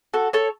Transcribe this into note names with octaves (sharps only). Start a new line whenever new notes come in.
F#4 A4
A4 C#5